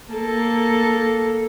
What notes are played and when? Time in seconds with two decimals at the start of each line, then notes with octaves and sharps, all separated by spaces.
0.12 A#3 A4